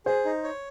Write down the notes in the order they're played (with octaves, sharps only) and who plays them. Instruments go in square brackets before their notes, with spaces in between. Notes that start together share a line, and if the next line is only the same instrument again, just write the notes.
[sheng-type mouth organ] G#4 [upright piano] C5
[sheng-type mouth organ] D#4
C#5